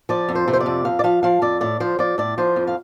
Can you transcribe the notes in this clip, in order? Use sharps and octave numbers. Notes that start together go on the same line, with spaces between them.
F3 D5
F2
C5
C3
C5
D5
F2
F2 F5
D5
F3 F5
F3 F5
F2 D5
A2 D5
F3 C5
F3 D5
A2 D5
F3 C5
F2
F5